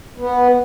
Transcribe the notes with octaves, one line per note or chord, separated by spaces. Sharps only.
B3